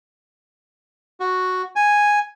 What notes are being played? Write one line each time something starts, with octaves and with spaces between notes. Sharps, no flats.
F#4
G#5